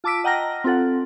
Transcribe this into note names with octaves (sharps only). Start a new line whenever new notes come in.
F4 A5 D6 E6 B6 D7
D#5 F#5 G5 A#5 F6 A#6
C4 F4 A4 F#5